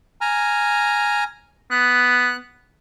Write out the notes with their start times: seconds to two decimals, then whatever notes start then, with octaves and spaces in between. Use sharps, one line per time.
0.21 G#5 A#5 F6
1.71 B3 F#6